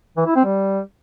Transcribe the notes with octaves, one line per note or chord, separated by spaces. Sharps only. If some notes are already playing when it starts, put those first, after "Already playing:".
E3
E4
C4
G3